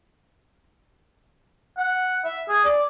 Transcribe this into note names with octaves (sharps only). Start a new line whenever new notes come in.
F#5
E5
G#4
D5